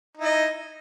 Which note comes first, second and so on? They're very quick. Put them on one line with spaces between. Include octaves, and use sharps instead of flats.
D#4 E4 D#5